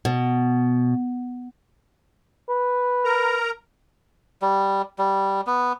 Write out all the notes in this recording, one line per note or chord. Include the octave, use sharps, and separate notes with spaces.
B2
B4
A#4 A#5
G3
G3
B3